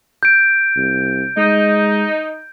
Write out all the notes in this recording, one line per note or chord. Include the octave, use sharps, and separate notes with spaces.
G6 D7
C2
G#3 D#4